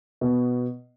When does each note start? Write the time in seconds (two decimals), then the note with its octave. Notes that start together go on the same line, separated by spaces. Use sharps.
0.21 B2